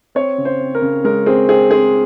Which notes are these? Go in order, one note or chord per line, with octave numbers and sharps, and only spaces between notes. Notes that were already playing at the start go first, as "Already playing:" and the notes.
C4 C#5
C#3
C5
C4
A#4
C#3
G#3 A#4
C4 G#4
C4 G#4
C4 G#4